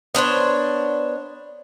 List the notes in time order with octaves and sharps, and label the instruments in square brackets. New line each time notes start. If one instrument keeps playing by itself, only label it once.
[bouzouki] B3 D4 C5 C#5